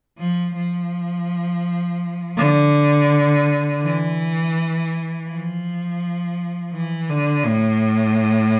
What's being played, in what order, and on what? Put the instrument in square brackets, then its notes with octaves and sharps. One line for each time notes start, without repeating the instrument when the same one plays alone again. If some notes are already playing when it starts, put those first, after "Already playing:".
[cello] F3
F3
D3
E3
F3
E3
D3
A2